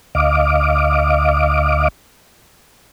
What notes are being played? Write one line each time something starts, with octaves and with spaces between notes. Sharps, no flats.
D2 D#5 F5 D6